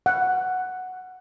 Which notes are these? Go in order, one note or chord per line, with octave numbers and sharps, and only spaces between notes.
F#5